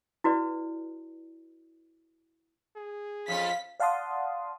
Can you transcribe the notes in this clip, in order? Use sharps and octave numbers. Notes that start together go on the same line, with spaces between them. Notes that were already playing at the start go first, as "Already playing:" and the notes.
E4 F#4 B4 D5
G#4
F2 C#4 F4 F5 B6
D5 F5 F#5 A5 C6 D#6